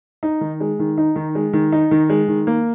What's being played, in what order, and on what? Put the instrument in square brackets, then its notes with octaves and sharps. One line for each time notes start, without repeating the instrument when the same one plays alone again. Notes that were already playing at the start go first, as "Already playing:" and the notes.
[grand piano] D#4
D#3
G#3
D#3
D#4
D#3
G#3
D#3
D#4
D#3
G#3
D#3
A#3